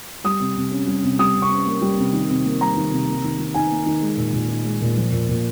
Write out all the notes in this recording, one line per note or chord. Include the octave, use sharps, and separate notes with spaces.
G3 D#6
C3
C3
C#4
G3
C3
G3 D#6
C3
C#6
C#4
A#3
G3
C3
D#3
C3
A#3
G3 A#5
D#3
C3
A#3
D#3
D#3
D#4 G#5
A#3
D#3
G#3
A#2
A#2
D#4
G#3
A#2
F3
A#2
A#2